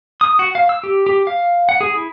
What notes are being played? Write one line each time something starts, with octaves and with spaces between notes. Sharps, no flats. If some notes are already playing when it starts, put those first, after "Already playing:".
D#6
F#4
F5
E6
G4
G4
F5
F#5
G#4
E4